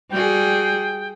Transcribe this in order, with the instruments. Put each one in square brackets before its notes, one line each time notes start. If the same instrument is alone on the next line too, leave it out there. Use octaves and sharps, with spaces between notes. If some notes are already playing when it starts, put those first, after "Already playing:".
[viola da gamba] G3 F#4 G#4 [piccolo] G5